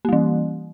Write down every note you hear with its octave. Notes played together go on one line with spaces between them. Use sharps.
E3 G3 A#3